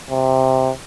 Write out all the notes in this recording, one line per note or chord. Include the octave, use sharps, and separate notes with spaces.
C3